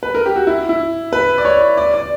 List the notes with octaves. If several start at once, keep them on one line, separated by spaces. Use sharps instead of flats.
B4
A#4
G4
F#4
E4
E4
B4
D5
C#5
D5
D5